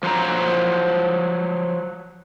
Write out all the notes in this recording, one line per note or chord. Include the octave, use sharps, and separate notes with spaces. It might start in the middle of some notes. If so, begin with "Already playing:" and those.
F3 F#3 C5 F#5 A#5